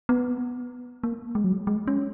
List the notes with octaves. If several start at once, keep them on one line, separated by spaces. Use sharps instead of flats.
B3
A#3
G#3
F#3
G#3
G#3
C#4